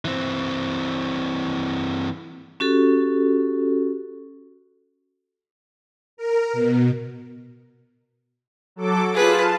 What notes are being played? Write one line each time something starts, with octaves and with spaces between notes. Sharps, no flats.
E3 C4
C#4 F#4 G4 A4
A#4
B2
F#3 A4 D6
F4 G#4 B4 A5